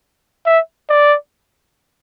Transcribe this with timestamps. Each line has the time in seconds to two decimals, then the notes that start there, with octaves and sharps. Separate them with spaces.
0.46 E5
0.90 D5